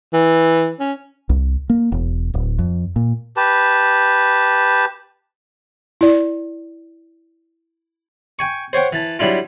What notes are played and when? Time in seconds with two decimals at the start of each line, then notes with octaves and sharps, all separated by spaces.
0.13 E3
0.80 C#4
1.29 C2
1.70 A#3
1.92 E1
2.34 D1
2.59 F2
2.96 A#2
3.37 G4 B4 A5
6.01 E4 D5
8.39 G5 G#5 C#6
8.73 C5 C#5 F#5 G5
8.93 E3 A5
9.19 F#3 G3 D4 E4 F4